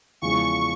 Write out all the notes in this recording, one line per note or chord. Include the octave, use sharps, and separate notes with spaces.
E2 C#3 F3 G#3 C#6